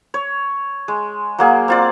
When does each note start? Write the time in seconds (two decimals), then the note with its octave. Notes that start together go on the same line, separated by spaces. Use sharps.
0.14 C#5
0.88 G#3
1.39 F#3 A#3 G#4
1.68 C4 F4 D5